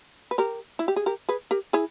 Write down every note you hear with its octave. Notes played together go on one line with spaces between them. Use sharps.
B4
G4 A#4
E4
G4
G#4
G4 A#4
G#4 B4
G4 A#4
E4 G#4